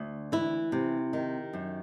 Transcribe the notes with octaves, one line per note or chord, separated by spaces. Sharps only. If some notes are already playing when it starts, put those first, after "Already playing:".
Already playing: D2
E3 E4
C3
D#3
F#2